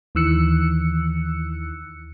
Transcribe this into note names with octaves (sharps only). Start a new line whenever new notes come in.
D#2 D#3 E3 E6 F#6 C#7